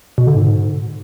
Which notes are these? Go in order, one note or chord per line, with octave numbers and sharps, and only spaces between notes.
B2
D3
G#2